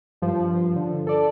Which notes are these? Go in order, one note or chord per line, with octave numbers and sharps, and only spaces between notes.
G2 F3
D3
A4 D5